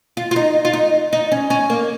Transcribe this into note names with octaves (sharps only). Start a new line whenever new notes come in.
F4
F4
D#4
F4
D#4
D#4
C#4
C#4
A#3